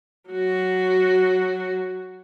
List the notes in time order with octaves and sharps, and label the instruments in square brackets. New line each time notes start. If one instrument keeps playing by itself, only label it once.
[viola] F#3 F#4